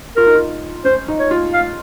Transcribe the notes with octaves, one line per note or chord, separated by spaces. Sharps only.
F4 A#4
D#4
F4
C#4 C5
D#4
C#5
F4
F5